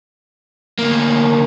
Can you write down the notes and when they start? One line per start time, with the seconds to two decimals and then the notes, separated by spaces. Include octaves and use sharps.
0.79 D2 A#3